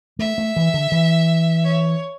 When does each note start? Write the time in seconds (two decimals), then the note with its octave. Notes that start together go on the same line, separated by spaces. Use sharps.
0.19 A3 E5
0.38 A3
0.56 E3
0.74 D3
0.92 E3
1.65 C#5